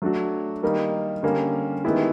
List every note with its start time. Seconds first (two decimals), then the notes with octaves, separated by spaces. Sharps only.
0.02 F#3 A3 D4 F#4
0.63 D#3 G3 A#3 D#4
1.23 D3 G3 A#3 C#4
1.84 D#3 G#3 B3 E4 G4